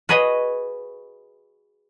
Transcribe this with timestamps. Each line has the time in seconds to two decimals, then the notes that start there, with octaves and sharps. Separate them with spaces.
0.09 F#4 G#4 B4 C#5 D#5